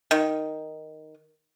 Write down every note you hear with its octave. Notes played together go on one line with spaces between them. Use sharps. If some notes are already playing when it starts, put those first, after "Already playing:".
D#3